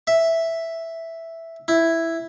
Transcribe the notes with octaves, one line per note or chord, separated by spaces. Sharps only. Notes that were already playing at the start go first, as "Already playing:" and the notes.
E5
E4